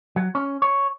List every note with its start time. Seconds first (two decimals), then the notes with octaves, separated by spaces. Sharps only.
0.16 F#3
0.35 C#4
0.62 C#5